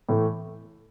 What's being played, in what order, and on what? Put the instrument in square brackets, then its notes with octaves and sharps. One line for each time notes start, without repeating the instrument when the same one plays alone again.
[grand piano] A2 E3 A3